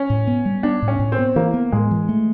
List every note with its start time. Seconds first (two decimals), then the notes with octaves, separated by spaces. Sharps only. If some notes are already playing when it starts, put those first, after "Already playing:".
Already playing: C#4
0.10 A2
0.27 B3
0.45 G3
0.63 B3 D4
0.82 A2
0.88 C#4
0.99 A2
1.12 C4
1.19 B3
1.36 E3 A#3
1.54 B3
1.72 A2 G#3
1.91 E3
2.09 A3